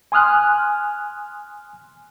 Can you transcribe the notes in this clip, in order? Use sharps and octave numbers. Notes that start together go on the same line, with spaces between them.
G#5 C6 D#6 F6 F#6